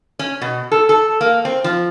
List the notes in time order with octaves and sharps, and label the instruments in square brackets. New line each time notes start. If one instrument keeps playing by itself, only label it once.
[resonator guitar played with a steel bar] C#4
B2
A4
A4
A#3
C4
F3